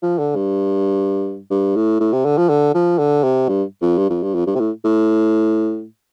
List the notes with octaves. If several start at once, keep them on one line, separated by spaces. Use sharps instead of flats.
F3
D3
G2
G2
A2
A2
C3
D3
F3
D3
F3
D3
C3
G2
F2
G2
F2
G2
F2
G2
C3
A2
A2